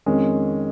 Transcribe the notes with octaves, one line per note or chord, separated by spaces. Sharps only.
F2 D#3 G#3 C#4